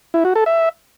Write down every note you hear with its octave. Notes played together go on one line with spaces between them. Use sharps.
E4
F#4
A4
E5